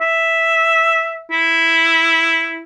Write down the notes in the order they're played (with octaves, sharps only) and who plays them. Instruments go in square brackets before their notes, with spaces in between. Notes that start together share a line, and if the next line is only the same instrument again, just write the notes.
[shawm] E5
E4